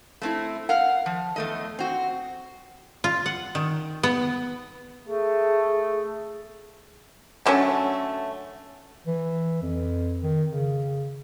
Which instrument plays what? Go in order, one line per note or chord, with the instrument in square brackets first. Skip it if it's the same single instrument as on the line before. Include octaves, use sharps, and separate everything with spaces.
[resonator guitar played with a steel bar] A3 C4 E4
A#4 F5 F#5
F3
E2 A3 D#5
C4 F#4
[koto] F4
F#5
D#3
B3
[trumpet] A3 [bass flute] G#4
[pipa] D3 F#3 A3 C#4
[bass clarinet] E3
F2
D#3
C#3